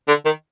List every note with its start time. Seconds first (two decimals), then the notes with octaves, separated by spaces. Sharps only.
0.08 D3
0.25 D#3